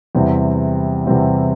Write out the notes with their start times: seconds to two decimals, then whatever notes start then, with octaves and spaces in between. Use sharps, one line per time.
0.15 E2 C3 G3 C4 E4
1.06 E2 C3 G3 C4 E4